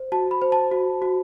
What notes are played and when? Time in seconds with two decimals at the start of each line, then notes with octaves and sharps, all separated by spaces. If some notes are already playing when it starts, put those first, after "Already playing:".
Already playing: C5
0.12 F#4 A5
0.31 B5
0.42 C5
0.52 A5
0.72 F#4
1.02 F#4